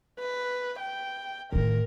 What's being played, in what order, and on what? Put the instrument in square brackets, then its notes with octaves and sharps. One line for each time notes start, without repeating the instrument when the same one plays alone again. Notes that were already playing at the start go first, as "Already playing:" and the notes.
[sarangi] B4
G5
[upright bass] A2 D#3 [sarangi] A#4